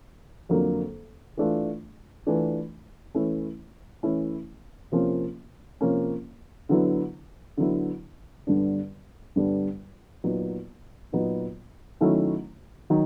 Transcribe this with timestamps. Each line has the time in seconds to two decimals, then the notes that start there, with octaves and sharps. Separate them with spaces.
0.49 F2 D3 F#3 A#3
1.37 E3 A3 D4 F4
2.26 E3 A3 D4 F4
3.14 E3 A3 C#4 E4
4.03 E3 A3 C#4 E4
4.92 C3 F3 A#3 C#4
5.81 C3 F3 A#3 C#4
6.69 D3 F#3 B3 E4
7.57 D3 F#3 B3 E4
8.47 G2 D3 G3 B3 D4
9.36 G2 D3 G3 B3 D4
10.24 A#2 F#3 B3 D#4
11.13 A#2 F#3 B3 D#4
12.01 D#3 F#3 A3 C#4 E4
12.90 D#3 F#3